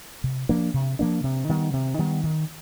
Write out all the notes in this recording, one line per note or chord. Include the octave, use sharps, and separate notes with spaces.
C3
F3 A#3 D4
C3
F3 A#3 D4
C3
D#3 G3 B3
C3
D#3 G3 B3
D#3